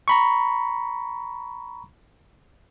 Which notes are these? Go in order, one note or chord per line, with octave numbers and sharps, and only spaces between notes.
A#5 B5 C#6